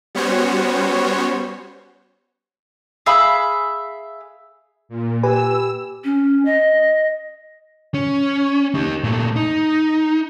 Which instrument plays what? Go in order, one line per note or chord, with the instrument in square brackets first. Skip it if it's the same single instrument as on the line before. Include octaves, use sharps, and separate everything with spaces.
[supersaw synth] G3 B3 C#4 F#4 C5 C#5
[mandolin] G#4 E5 F5 B5
[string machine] A#2
[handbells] G4 G#5 [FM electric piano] B4 [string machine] E6
[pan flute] C#4
D#5
[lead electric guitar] C#4
D#4 G4
A#2 A3
D#4